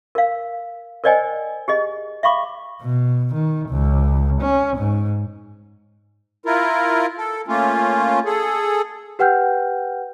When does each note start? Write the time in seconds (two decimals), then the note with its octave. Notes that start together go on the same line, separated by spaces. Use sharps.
0.15 A#4 F5
1.04 A#4 C5 D5 D#5 G5 G#5
1.68 G4 G#4 D#5
2.23 E5 F5 B5 C#6 D6
2.82 B2
3.34 D#3
3.69 C#2
4.42 C#4
4.77 G#2
6.46 E4 F4 A#4
7.18 A4
7.48 A3 A#3 C#4 F4
8.25 G#4 A4
9.19 G4 B4 F#5 G5 F6 G6